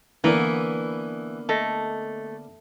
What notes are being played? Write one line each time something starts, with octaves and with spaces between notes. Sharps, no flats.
D3 E3 A#3 B3 D5 A#5
A3 A4 D#5